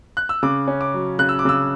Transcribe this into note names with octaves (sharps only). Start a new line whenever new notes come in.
F#6
E6
C#3 D6
C#4
D6
F#3
C#3 F#6
E6
D6
C#3 E6